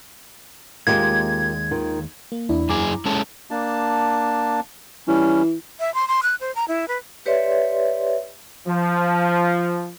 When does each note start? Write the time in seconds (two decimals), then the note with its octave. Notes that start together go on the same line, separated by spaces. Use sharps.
0.87 D#2 G#3 A#3 F4 G4 G#6
1.71 D#3 F4
2.32 A#3
2.49 E2 D4 E4
2.69 F#2 G#4 A#5 D6
3.06 G#3 C#4 A4
3.51 A#3 D4 A5
5.08 E3 G3 C#4
5.80 E5
5.94 C6
6.08 C6
6.23 F#6
6.40 C5
6.55 A#5
6.68 E4
6.88 B4
7.26 G4 B4 C#5 D5 E5 C6
8.67 F3